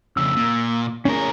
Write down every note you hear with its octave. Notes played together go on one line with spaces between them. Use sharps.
F2 C#3 E6
A#2
A2 C#4 G#4 A#4